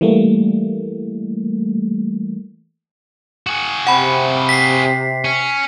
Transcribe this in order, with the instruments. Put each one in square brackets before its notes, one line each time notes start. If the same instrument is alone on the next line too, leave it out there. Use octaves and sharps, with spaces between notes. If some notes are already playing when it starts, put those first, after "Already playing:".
[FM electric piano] E3 G3 A3 A#3
[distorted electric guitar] F#4 G#4
[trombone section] C3 [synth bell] F#5 B5
[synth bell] B6 C7
[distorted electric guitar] C#4